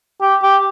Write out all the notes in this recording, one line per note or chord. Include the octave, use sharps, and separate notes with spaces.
G4
G4